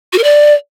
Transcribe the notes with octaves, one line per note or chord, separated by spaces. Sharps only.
F#4
A#4
D5